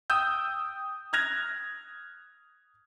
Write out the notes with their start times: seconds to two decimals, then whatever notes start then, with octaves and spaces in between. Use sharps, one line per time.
0.10 G5 D#6 E6 G6
1.13 F6 F#6 G#6 A#6 F7